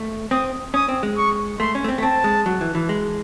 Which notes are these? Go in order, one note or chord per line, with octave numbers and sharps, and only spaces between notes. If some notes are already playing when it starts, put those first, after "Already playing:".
Already playing: A3
C4 D#6
C#4 D#6
C4
G#3
C#6
A3 C6
C#4
A3
C4
A3
C4 A5
G#3
F#3
E3
E3
G#3